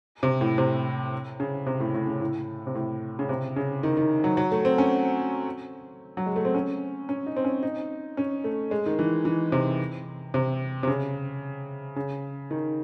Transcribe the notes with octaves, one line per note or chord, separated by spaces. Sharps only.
C3
A2
C3
C#3
C3
A2
A2
C#3
A2
C3
A2
C#3
C3
C#3
D#3
D#3
F#3
F#3
A3
C4
C#4
F#3
G#3
A3
C4
C#4
C#4
D#4
C4
C#4
D#4
C#4
A3
G#3
D#3
E3
E3
C3
C3
C3
C#3
C#3
D#3